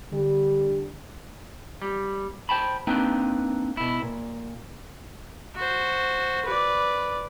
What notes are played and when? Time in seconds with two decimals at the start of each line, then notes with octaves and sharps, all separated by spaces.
0.12 D3 G3
1.82 G3
2.49 C5 G5 A5 B5
2.87 A#3 C4 D4 D#4 B4 G5
3.77 B2 E4
4.02 A#2
5.55 F#4 C5
6.45 B4 D5